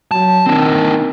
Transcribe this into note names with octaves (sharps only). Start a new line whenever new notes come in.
F#3 A5
D#3 C4 D4